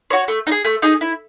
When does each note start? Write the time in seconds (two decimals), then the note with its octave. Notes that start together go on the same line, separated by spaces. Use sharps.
0.10 F#4 C#5
0.28 A3
0.47 D#4
0.51 G#4
0.65 A3
0.82 D#4 G#4
1.01 E4